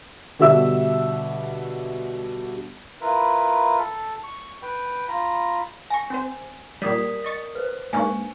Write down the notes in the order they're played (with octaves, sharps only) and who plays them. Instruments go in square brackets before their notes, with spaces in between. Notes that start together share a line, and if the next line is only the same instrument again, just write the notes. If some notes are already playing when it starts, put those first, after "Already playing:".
[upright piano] B2 D3 G3 E5 E6
[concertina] E4 F4 A#4 B4
A4
C#6
B4 G5
F4 A#5 B5
[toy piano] G#5 [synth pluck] C#6 A#6
[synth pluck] C4 C5
[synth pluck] A#2 G3 [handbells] A#4 D#6 B6 [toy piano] D5
[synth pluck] D#5 C#6 A6
[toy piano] B4 C5
[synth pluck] G#2 A#3 D4 [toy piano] C#4 [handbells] G#5 C#6